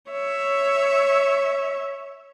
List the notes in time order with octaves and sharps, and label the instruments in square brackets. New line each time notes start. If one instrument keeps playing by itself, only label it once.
[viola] C#5 E5